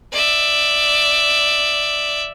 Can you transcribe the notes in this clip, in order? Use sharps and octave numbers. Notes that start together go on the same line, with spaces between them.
D5 E5